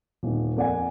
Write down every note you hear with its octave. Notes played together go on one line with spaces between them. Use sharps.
D#1 D#3
F2 A#3 D5 F#5 G#5